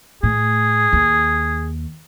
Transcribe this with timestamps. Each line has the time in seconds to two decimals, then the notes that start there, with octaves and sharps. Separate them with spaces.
0.23 A2 G#4
0.93 D#2